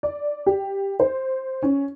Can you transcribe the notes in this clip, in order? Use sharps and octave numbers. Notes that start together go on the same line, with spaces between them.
D5
G4
C5
C#4